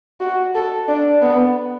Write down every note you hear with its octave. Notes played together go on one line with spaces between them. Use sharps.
F#4
A4
D4
B3